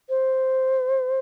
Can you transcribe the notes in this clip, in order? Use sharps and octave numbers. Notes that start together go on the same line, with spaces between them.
C5